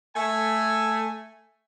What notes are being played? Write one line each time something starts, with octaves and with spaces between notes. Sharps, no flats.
A3 G#5